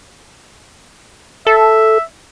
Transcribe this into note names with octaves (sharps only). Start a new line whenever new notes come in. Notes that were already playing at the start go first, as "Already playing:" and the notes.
A4 E5